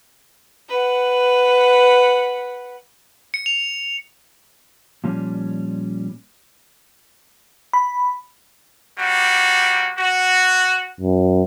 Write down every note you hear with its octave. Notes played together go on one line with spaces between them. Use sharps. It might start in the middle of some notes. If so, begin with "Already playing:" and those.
B4 F#5
C#7
F7
A#2 F3 G3 C#4
B5
G3 A#3 F#4
F#4
F#2